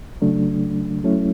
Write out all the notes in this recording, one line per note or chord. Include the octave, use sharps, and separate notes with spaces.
C#3 F#3 A3 D4
F#3 A3 C#4 E4